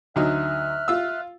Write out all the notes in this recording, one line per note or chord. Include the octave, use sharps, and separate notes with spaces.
D2 F#3 D#4 E5 F6 F#6
F4 E6